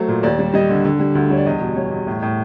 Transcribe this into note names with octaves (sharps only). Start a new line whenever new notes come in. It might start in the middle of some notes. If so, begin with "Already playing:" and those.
Already playing: F#3 A3 C5
A#2
D#2 D5
G3
G3 D#5
D3
D3
G3
D2
G3 C#5
D5
E2 D#5
B2
G3 C#5
E2
A2
A2